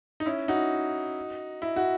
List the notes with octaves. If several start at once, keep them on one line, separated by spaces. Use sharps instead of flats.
D#4
C#4 E4
D#4 F#4
E4
F#4